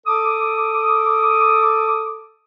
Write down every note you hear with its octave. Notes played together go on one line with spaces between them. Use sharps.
A4 D6 D#6